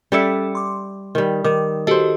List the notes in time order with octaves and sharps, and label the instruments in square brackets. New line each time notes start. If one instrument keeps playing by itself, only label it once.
[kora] G3 D5 E5 [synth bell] C#4 A4 C#7
[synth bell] C6 D6
[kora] D#3 G3
[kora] D#3 [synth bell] D6
[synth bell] F#4 G4 D#5 [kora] A4 C5